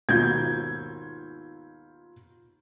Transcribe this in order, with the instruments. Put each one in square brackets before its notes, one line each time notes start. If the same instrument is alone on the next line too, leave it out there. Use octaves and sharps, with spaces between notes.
[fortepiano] D#2 G#2 B2 [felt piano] F4 G6 G#6